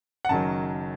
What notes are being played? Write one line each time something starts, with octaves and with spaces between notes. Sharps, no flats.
F#5
F#1 F#2 D#3 F#3 A5